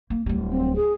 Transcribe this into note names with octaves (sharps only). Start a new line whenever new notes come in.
A#3
D1 G3
C4
G#4